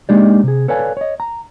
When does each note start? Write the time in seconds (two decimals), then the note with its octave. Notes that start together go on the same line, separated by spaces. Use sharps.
0.09 G#3 A#3 D4 D#4 G4 D5
0.43 C3 G#4
0.68 A4 B4 C#5 D5 F5 G#5
0.97 C#5 D#5
1.20 A#5